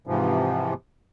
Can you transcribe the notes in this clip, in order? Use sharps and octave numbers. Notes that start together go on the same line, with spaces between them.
G#2 C3 E3 F3